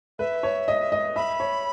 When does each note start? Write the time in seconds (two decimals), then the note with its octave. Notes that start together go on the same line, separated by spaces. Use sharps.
0.19 B4 E5
0.43 C#5
0.68 D#5
0.92 D#5
1.16 E5 B5
1.40 C#5